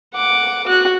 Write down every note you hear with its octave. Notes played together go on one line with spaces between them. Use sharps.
F#5 D6
F#4 F#6